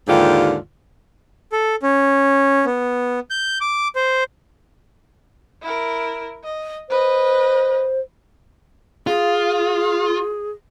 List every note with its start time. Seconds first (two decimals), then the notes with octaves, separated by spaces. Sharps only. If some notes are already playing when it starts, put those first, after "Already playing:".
0.08 D#2 G#2 D3 F4 G4
1.52 A4
1.83 C#4
2.65 B3
3.30 G6
3.61 D6
3.96 C5
5.62 E4 A#4
6.44 D#5
6.90 B4 C5 D#5
9.07 F4 G#4